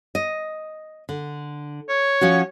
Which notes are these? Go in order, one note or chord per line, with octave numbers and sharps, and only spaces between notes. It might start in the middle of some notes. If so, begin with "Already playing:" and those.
D#5
D3
C#5
F3 C#4 F#4